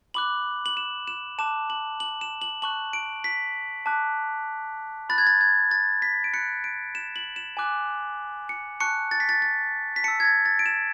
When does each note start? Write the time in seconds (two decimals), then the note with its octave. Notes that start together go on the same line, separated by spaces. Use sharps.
0.14 B5 D6 F#6 F#7
0.66 F#7
0.77 E7
1.07 E7
1.38 A5 D6 F#6 E7
1.70 F#7
2.00 F#7
2.21 E7
2.41 F#7
2.62 A5 C#6 F#6 F#7
2.93 D7
3.24 B6
3.86 A5 D6 F#6
5.09 B5 F#6 A6
5.18 G#6
5.27 A6
5.41 G#6
5.71 A6
6.02 B6
6.24 D7
6.33 B5 F#6 C#7
6.64 D7
6.95 E7
7.16 F#7
7.36 E7
7.57 G#5 D6 F#6
8.49 C#7
8.80 A5 C#6 F#6 C#7
9.11 A6
9.20 B6
9.29 A6
9.42 A6
9.96 B6
10.04 A5 E6 C#7
10.20 G#6
10.25 A6
10.46 A6
10.59 D7
10.66 E7